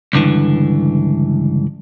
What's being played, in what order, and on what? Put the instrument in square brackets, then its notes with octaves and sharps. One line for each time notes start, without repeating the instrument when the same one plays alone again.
[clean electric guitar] C#2 G2 D3 E3